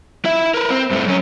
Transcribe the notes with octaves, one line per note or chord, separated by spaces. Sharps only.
E4 E5
A#4 B4
C4
G2 A3
F#2 C#4